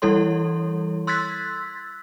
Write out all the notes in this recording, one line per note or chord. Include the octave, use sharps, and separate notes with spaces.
E3 G3 E4 A4 C#5 C6
C6 E6 F#6 G#6 A6 B6